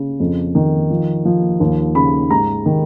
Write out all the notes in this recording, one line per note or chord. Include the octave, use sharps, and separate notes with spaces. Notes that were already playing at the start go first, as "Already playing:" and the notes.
Already playing: C#3
F2
D#3
F3
F3
D#2
C#3 B5
G#2 A#5
D#3